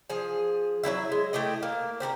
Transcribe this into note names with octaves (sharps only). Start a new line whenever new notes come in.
F3 G#4
F#3 A#3 E4 E5
G#3
A3 E4 G4 D#5
A#3
C4 G4 G#4 A#4